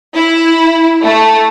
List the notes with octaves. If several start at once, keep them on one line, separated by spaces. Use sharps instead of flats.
E4
A3